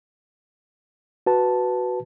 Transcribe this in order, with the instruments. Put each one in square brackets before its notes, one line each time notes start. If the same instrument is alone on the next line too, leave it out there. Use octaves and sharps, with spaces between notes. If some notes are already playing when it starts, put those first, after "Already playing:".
[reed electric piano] F#4 B4 A5